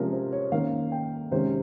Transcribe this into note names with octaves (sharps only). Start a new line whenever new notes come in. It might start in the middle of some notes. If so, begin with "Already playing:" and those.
Already playing: C3 F3 G#3 C#4 A#4
C5
C#5
D#3 A#3 C#4 F5
G5
C3 D#3 G#3 C#4 C5